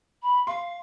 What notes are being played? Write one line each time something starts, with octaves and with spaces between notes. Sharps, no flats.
B5
F5 C6